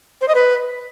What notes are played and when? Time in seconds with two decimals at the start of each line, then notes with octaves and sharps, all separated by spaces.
0.21 C5
0.28 D#5
0.35 B4